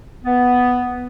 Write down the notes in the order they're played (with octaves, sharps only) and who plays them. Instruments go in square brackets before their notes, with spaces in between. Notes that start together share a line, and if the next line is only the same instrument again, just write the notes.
[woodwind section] B3